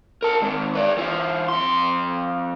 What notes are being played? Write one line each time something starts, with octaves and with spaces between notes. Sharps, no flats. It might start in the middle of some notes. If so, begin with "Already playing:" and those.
A#4 A5
D#3 G#3
B4 D5
E3 F4
F2 C6